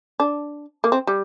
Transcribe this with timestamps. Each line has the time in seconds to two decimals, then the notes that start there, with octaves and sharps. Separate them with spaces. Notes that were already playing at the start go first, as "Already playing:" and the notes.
0.20 D4
0.84 A#3
0.92 C4
1.07 G3